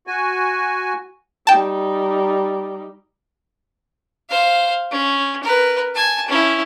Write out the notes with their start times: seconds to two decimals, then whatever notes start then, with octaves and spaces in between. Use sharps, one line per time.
0.07 F#4 G#5
1.47 G3 D#4 G5 A5
4.29 C5 F5
4.91 C#4
5.43 A#4 B4
5.95 G#5 A5
6.28 C#4 E4